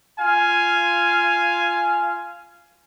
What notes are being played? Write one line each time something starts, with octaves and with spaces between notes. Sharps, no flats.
F4 F5 G#5